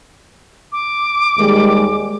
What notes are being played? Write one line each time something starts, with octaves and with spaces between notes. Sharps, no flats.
D6
D#2 G3 G#3